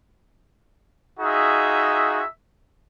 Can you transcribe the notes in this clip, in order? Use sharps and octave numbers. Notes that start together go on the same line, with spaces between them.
D#4 F4 F#4 G#4 E5